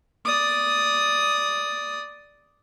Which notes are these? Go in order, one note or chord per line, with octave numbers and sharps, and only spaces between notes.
D5 D#6